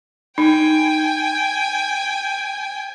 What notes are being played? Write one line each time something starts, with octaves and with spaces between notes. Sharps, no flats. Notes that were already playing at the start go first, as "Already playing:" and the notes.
D#4 G5 G#5